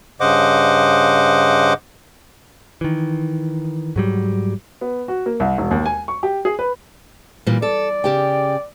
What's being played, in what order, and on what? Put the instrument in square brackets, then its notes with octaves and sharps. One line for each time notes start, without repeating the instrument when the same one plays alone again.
[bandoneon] G2 C#3 C5 D#5 F#5 D6
[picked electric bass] D#3 E3
G#2 F#3 G3
[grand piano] B3
F#4
A#3
C2
E1
D#2
G#5
C#6
G4
G#4
B4
[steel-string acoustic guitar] A#2 E3 G3
[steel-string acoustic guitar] A4 [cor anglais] D5
[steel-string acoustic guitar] C#3 G4 G5